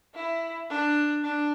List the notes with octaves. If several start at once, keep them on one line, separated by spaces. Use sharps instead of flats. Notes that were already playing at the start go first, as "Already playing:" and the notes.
E4
D4
D4